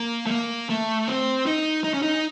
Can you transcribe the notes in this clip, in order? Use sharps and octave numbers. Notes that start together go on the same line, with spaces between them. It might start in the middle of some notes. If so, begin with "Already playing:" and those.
Already playing: A#3
A3
A#3
A3
C4
D#4
D#4
C#4
D#4